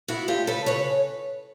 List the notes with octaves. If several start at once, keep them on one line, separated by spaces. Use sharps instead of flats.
B3 E4 F#4
D2 F4 G4
C#3 A4 B4
C#3 B4 C#5